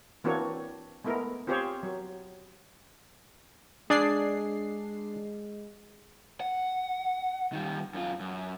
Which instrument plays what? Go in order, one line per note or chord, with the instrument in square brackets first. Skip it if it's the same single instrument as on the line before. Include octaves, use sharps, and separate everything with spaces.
[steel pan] E3 A#3 C4 D4 F#4 C#5
G#3 A3 B3 E4 A#4
C4 F4 G4 G#4 C5 C#5
F#3
[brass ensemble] G#3 [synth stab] D4 C7 [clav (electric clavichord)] G#4 D5
[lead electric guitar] F#5
D#3 G3
F#2 F4
F#2